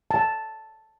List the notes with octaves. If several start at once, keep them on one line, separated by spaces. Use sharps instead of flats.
A5